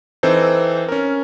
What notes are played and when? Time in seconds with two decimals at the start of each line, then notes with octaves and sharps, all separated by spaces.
0.23 E3 C4 D#4 A4 C5
0.88 C#4 A#4